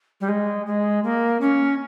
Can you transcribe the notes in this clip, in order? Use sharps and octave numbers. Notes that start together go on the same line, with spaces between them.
G3
G#3
G#3
A#3
C#4